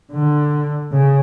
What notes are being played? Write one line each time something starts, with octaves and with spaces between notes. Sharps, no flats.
D3
C#3